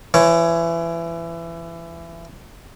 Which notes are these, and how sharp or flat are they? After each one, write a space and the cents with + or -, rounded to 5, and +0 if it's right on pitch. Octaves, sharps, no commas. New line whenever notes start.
E3 +25 C#5 +0